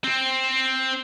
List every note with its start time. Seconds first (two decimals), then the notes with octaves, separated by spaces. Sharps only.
0.04 C4